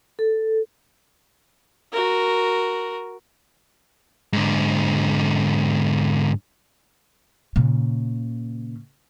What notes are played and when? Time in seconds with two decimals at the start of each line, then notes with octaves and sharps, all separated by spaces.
0.19 A4
1.92 F#4 A#4
4.33 G#2 D3
7.56 A#2 C#3